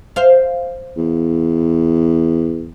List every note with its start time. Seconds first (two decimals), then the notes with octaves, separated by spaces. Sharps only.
0.16 C5 F5
0.97 E2